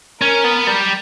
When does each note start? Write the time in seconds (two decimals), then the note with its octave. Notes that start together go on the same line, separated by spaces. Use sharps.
0.22 C#4 A#4
0.44 B3
0.67 G3